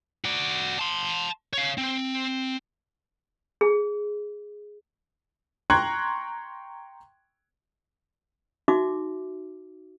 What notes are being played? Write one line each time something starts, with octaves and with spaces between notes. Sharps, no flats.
F#4 D5
A5 C6
C#5 F5
C4
G#4
G5 A#5 C6 C#6 F#6 G#6
D#4 F#4 E5 D6